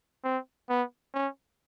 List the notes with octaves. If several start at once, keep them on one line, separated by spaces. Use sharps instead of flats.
C4
B3
C#4